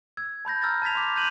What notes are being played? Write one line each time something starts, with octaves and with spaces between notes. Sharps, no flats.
E6 G#6
A5 B5 G6 A#6
A#5 E6 F6 G6 A6 A#6
A5 G#6 A6 B6 F7
C6 D6 F7
F#6 G6 A6 D#7 F7 F#7